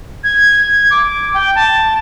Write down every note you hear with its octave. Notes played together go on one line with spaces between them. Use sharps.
G#6
D6
G5
A5